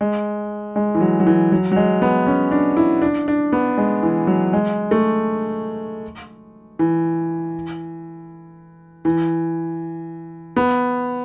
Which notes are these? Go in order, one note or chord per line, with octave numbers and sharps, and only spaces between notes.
G#3
G#3
E3
F#3
F#3
E3
F#3
F#3
G#3
B3
C#4
D4
E4
D4
D4
B3
G#3
E3
F#3
G#3
A3
E3
E3
B3